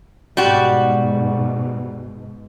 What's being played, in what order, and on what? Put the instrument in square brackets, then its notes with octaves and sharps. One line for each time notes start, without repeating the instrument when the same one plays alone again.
[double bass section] G#2 B2 [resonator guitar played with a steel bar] G3 F#4